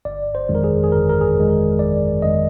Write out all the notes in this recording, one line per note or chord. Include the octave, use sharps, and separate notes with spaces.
G1 D5
C5
F2 D#3 G#3
A#4
G#4
G#4
G1 A#4
A#4
G#4
F2 D#3 G#3
A#4
G1 D5
F2 D#3 G#3 D#5